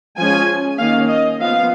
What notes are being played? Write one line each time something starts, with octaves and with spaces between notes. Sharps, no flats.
F3 G#3 C#4 G#5
D#3 A#3 C#4 F5
D#5
F3 B3 F5